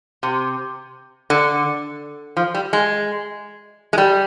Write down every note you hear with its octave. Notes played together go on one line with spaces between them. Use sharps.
C3
D3
F3
G3
G#3
G#3
G3